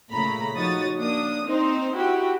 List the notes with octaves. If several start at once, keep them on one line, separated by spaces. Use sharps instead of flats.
A#2 C#3 A3 A#5 B5
F3 D#4 F#4 C#5 D#6 A6
A#3 D4 D#6
C4 D#4 C5
E4 F#4 G4